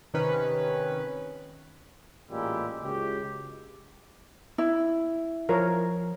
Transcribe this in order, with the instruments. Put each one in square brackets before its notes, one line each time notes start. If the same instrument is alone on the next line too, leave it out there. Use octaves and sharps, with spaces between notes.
[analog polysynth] C3 D#3 C#4 B4
[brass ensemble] A1 A#2 G#3 E4 G4
C#2 G#3 F#4 G4
[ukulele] E4
[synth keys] F3 [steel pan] A#4 C#5